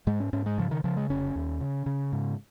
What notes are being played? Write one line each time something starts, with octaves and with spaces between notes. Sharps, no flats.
G#2 G#3
C#4
G#2 C#4
G#3
C#3 F3
D#3
C#3 F3
G#3
F1 C#4
D#2
C#3
C#3
G#2